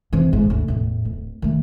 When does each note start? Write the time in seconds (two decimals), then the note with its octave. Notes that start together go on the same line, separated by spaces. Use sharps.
0.13 E3 C4
0.33 G1 G#2
0.50 D2
0.68 E2 A2
1.05 D1
1.42 D#3 A3